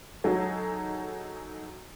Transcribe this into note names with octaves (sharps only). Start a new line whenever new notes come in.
F#3 D#4 G#4 A4